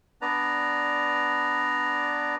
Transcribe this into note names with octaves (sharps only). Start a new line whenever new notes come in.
B3 D4 B4 D5 A#5